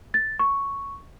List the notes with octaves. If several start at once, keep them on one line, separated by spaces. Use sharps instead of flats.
A6
C#6